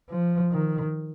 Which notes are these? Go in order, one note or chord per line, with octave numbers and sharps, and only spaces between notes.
F3
D#3